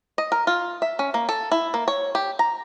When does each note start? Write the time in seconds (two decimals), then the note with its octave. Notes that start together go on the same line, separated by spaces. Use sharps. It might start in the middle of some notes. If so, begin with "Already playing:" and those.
0.18 D#5
0.32 A#4
0.47 F4
0.82 E5
0.99 C#4
1.14 A#3
1.29 A4
1.52 E4
1.74 A#3
1.88 C#5
2.15 G4
2.39 A#5